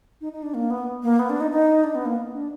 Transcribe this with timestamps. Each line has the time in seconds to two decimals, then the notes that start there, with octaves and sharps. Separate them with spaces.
0.21 D#4
0.32 D#4
0.43 D4
0.54 A#3
0.71 B3
1.03 A#3
1.19 B3
1.30 D4
1.41 D#4
1.51 D#4
1.84 D4
1.95 B3
2.05 A#3
2.33 D4